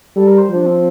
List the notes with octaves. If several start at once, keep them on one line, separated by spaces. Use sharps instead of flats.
G3 A4
A#4
C5
F3 D4
C4